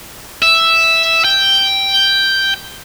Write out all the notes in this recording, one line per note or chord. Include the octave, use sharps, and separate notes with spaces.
E5
G5